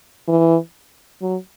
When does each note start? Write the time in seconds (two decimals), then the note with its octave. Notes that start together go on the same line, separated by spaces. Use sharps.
0.28 E3
1.22 F#3